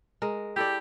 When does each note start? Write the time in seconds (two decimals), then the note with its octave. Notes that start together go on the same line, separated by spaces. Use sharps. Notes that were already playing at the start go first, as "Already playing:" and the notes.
0.22 G#3 A#4
0.56 E4 G4 A4 D5